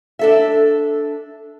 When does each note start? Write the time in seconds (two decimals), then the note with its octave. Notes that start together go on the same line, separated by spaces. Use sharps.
0.19 D4 A4 E5